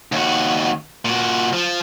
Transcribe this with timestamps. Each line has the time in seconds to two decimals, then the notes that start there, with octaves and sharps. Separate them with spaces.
0.12 D#2 F#4
1.05 A#2 F#4
1.53 F3